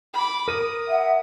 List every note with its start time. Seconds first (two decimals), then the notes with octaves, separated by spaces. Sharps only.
0.14 B5 D6
0.48 A#4 D#6 D#7
0.89 E5 F#5